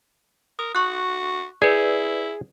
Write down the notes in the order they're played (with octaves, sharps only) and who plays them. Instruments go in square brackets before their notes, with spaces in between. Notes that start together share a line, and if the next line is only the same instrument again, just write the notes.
[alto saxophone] A#4 [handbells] D#6
[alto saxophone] F#4 [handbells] C#6 F#6
[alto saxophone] E4 [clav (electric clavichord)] G#4 [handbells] B4 D5